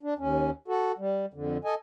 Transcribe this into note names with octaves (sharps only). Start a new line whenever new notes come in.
D4
D#2 C#4
F#4 A4
G3
F2 D3
A4 D#5 G#5